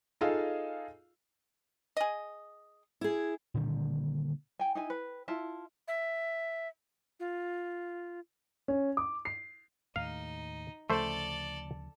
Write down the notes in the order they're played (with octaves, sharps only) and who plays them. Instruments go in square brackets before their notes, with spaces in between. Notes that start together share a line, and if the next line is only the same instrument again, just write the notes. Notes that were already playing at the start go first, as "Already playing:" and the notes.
[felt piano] D#4 F4 G#4 A4 D#5 F5
[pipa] G#4 D#5
[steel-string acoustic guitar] E4 G#4
[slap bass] A#2 D3 D#3 G3
[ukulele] G5 G#5
D#4 E4 G#5
B4
E4 F4 E5 A5
[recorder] E5
F4
[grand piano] C#4
D6
C7
[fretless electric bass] D#2 A2 [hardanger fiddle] D#4 [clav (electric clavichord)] F5
[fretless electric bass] D2 C#3 F3 [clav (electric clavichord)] A3 C5 [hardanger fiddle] A4 D5